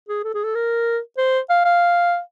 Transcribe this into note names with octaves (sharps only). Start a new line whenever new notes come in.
G#4
A4
G#4
A4
A#4
C5
F5
F5